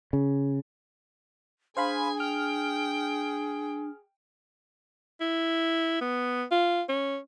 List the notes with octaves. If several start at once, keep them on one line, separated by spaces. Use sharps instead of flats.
C#3
D4 G#4 C5 F5 G#5 B5
G5 F6
E4
B3
F4
C#4